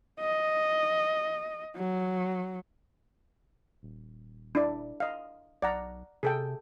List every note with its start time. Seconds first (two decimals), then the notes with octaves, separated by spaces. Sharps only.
0.20 D#5
1.76 F#3
3.83 D#1
4.55 D4 E4 D5
5.00 D#5 F5
5.62 B1 D5 F#5 A#5
6.23 C3 G#4 A4 G5